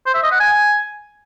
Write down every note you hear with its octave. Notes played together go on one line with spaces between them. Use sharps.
C5
E5
D#5
F#5
G#5